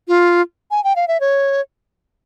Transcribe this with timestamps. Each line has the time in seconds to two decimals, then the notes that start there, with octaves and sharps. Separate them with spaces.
0.08 F4
0.71 G#5
0.84 G5
0.96 F5
1.08 E5
1.20 C#5